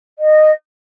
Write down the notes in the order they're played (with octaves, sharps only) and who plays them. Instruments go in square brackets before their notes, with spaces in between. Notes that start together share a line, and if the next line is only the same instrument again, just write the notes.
[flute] D#5